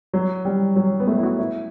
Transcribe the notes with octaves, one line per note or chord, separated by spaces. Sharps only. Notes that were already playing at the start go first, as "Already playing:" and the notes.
F#3
G3
F#3
B3
A3
E4
F#4
E4